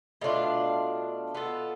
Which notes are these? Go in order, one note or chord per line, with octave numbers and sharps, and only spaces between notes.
B2 A3 D4 F4
B3 F4 A4